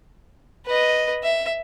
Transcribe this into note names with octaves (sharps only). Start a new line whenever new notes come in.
B4 D#5
E5